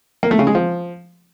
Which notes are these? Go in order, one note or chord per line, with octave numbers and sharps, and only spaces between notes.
A#3
A3
C#3
G#3
F3